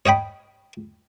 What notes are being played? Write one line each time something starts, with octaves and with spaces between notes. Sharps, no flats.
C#5 D#5 G5 B5